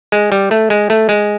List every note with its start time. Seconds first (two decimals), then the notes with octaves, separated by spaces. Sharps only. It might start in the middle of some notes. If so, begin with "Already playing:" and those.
0.12 G#3
0.32 G3
0.51 A3
0.70 G#3
0.90 A3
1.09 G#3